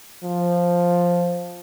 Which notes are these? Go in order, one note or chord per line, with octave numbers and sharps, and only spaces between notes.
F3